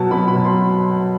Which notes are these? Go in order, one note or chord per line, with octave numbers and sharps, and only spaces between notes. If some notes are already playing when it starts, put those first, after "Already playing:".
Already playing: B2 F#3 A5
B2 B5
B5
F#3
C6